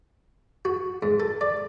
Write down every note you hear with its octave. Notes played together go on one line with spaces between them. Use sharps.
F#4
G#2
A4
D5